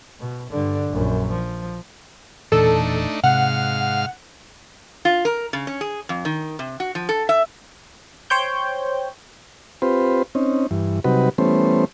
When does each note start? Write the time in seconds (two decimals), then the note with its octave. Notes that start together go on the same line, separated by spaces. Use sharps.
0.20 B2
0.51 G2 D3
0.90 A#1 F#2
1.32 F3
2.52 E1 A#2 E3 A3 D4 D#4 A4
3.24 G#2 C3 F5 F#5 F6
5.05 F4
5.25 A#4
5.53 C#3
5.67 C#4
5.81 G#4
6.09 F2
6.25 D#3
6.59 C3
6.80 F#4
6.95 F3
7.09 A4
7.29 E5
8.30 C5 C#5 G5 G6
9.82 C4 F4 G4 B4 C5
10.35 C4 C#4 D#4
10.71 G2 E3
11.04 C3 F#3 G3 D#4 F#4 B4
11.38 E3 G3 A3 B3 C#4 C5